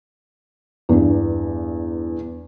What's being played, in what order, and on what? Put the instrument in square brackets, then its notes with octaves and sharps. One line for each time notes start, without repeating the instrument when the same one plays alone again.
[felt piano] E2 G2